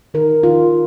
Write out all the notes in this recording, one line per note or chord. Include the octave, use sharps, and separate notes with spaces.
D#3 A#4
D#3 F4